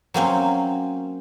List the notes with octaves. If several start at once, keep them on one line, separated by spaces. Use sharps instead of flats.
F#3 A#3 C4 C#4